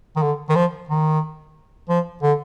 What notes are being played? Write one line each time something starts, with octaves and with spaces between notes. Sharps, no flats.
D#3
D3
D#3
F3
D#3
F3
D3